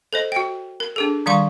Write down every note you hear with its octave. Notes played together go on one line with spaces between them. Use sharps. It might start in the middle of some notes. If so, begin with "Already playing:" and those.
A4 C5 D#5
F#4 G5
A#4
D4 G#4 A4
D#3 G3 F5 C6 C#6